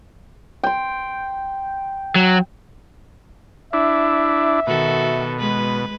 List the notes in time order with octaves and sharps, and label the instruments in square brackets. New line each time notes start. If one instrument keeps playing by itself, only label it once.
[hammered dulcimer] G5 C6
[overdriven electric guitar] F#3
[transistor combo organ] D4 E4 [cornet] E5
[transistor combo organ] B2 [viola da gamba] D#3 F#4 A4
[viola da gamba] G#3 B4